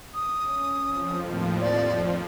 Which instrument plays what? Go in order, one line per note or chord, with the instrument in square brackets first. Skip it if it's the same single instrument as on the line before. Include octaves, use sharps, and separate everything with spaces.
[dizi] D#6
[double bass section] C#4
[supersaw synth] F2 F3
[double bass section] D#2 A2 D#3
[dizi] D5